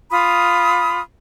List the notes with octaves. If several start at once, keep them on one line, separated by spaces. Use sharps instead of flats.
F4 B5 D#6